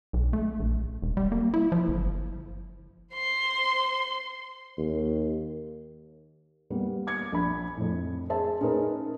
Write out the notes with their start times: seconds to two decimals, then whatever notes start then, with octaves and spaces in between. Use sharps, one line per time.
0.13 B1
0.33 A3
0.60 A#1
1.02 E1
1.17 G3
1.32 A#3
1.54 E4
1.72 F3
1.88 G1
3.13 C5 C6
4.77 D#2
6.70 G3 A#3 B3
7.07 D6 G#6 C#7
7.32 A#1 D4 B5
7.77 F2 A2
8.30 G#4 C5 E5 A5
8.61 C#4 D#4 G#4 A#4 B4 D#5